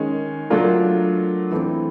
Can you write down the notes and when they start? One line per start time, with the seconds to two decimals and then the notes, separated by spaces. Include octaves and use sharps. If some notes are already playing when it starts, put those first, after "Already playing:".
Already playing: D#3 G#3 C#4
0.50 F#3 A3 D4 F4 A#4
1.52 E3 A3 C4